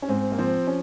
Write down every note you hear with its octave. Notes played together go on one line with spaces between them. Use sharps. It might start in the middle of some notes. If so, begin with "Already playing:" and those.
C#4
G#2 C4
A#3
F3 C4
C#4